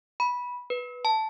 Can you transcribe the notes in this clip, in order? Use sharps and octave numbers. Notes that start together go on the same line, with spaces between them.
B5
B4
A5